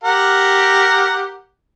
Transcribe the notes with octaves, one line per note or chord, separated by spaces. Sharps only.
G4 A#4 F#5